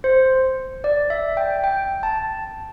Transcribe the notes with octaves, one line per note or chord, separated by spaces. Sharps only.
C5
D5
E5
G5
G5
A5